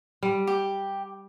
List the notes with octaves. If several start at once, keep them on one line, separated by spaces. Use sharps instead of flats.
G3
G4